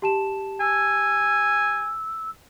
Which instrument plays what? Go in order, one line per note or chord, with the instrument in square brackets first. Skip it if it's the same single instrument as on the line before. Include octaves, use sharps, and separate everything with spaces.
[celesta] G4 A5 E7
[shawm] G#5 [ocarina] E6